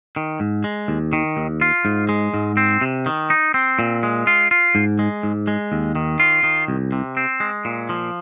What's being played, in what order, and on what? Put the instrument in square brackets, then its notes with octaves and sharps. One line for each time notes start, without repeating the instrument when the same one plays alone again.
[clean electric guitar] D#3
G#2
G#3
D#2
D#3
D#2
F4
G#2
G#3
G#2
C4
C3
D#3
D#4
C4
A#2
G#3
F4
F4
G#2
G#3
G#2
G#3
D#2
D#3
F4
D#3
C2
C3
C4
G#3
A#2
F3